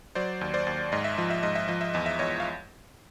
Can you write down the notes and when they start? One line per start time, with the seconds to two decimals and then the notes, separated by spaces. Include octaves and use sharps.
0.15 F#3 C5 D5
0.41 D#2
0.54 C5 D5
0.67 D#2
0.92 G#2 D#5
1.04 E5
1.17 F3 D#5
1.30 E5
1.43 G#2 D#5
1.55 E5
1.68 F3 D#5
1.81 E5
1.94 E2 D#5
2.06 E5
2.19 E2 C#5 D#5
2.40 F5